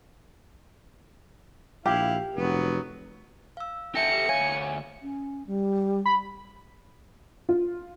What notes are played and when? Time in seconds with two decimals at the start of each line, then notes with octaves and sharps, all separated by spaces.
1.86 A#1 E4 G4 F5
2.36 F1 F#3 B3
3.57 F5 E6
3.95 G4 A4 E5 A#6 C#7
4.29 D2 C#5 F5 G#5 G#6
5.02 C#4
5.47 G3
6.06 B5
7.49 F4